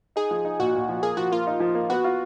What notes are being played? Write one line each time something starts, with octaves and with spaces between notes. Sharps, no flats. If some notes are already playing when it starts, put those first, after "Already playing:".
D#4 G#4
F3
D#4
A#2 F#4
A#2
F3
A#3 G#4
F3 F#4
A#3 F4
D#4
F3
A#3
B3 F#4
F4